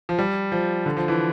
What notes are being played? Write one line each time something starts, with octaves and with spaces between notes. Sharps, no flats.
F3
G3
F3
D3
F3
E3